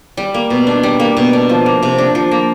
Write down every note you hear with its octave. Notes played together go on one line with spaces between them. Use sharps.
G3
A#3
B2
D4
G3
A#3
B2
D4
F3
A#3
C3
D4
F3
A#3